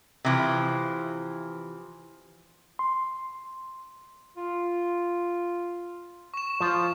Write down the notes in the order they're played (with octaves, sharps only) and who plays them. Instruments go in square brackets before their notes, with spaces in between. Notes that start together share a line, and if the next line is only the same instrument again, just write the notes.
[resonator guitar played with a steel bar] C3 E3 F3
[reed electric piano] C6
[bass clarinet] F4
[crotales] C#6 E7
[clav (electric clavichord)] F3 F4 [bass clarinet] C5